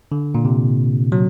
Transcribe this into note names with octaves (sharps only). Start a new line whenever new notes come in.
D3
A#2
C3
F#3